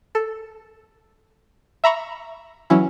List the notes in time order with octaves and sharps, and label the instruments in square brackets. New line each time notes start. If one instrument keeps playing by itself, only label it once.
[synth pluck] A4
E5 A#5 B5 C#6
E3 F#3 C#4 E4